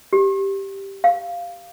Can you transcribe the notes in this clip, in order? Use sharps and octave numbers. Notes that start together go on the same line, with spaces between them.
G4
F5